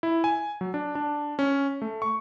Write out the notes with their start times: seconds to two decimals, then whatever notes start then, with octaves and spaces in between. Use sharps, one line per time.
0.03 E4
0.24 G#5
0.61 F#3
0.74 D4
0.95 D4
1.39 C#4
1.82 A3
2.02 C#6